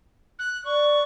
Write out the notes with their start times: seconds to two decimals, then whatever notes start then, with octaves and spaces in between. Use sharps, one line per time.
0.39 F#6
0.65 D5 C#6